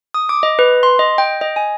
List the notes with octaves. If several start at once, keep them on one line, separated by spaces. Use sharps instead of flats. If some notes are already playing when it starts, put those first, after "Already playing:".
D#6
D6
D#5
B4
C6
D#5
G5
D#5
G#5